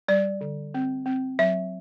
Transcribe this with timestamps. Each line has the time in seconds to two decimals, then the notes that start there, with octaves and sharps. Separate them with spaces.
0.08 G3 D5
0.41 D3
0.74 C4
1.06 C4
1.39 F#3 E5